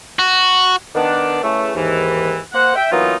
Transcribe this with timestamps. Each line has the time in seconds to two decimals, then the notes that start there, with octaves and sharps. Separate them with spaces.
0.19 F#4
0.95 D#3 B3 D4
1.44 C#3 E3 A3
1.75 D#2 G#2 E3
2.54 A#3 C5 F#5
2.76 E5 G5
2.92 E3 F#3 A#3 B3 D#4 F4